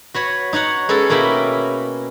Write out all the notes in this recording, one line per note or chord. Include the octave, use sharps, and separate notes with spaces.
F#4 B4 C#5
D#4 F#4 C#5 F#5
G#3 B3 C#4 F#4 A4
B2 A#3 C#4 E4 G5 B5